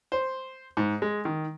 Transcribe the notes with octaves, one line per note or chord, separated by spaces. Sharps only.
C5
G#2
G#3
D#3